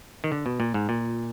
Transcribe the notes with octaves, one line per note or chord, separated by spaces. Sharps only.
D#3
D3
B2
A#2
G#2
A#2